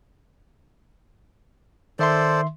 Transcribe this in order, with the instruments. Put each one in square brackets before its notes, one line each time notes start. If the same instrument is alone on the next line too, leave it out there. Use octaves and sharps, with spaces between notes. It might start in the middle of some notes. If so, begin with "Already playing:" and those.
[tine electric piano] D#3 E5 C6 [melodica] A4 C5 D5